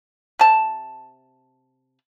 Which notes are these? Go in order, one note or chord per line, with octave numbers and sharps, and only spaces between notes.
C3 A5